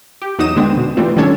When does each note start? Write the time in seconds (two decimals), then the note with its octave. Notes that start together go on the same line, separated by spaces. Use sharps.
0.22 G4
0.38 E2 F#3 D#4 D#5 D#6 E7
0.56 D3 G#3 B3 C4 D4
0.77 B2
0.97 E3 G3 A3 C4 F4
1.16 D#3 G3 C#4 D4 A4 C#5